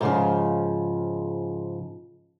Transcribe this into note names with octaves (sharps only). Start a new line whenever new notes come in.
G#2 C#3 F3